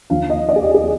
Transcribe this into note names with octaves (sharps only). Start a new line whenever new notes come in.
D#2 D3 F3 F5
D#5
D5
G#4
G4
G#4